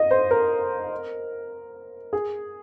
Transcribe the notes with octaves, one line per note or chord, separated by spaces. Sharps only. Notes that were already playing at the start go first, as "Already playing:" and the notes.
Already playing: D#5
C5
A#4
G#4